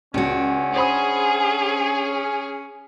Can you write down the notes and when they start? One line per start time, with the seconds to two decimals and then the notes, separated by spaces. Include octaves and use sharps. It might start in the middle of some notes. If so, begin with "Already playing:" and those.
0.14 C#2 C#4 D4 F#4
0.76 G#4 C5 B5 D#6